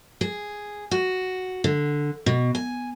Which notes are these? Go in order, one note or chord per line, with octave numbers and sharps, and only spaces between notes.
G#4
F#4
D3
B2
G#5